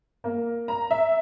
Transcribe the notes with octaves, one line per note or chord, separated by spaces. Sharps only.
A#3
A#5
E5